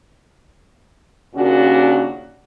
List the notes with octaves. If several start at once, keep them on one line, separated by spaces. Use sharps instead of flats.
D#2 A#2 C#3 D4 F#4